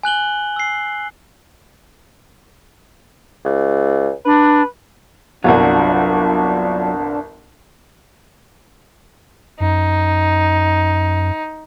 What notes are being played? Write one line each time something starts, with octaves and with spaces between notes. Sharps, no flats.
G#5 F#6 F#7 G7
E6 C7
C#2
D4 B4
G1 C2 F#3 D4 F4 F#4
F#2 D#4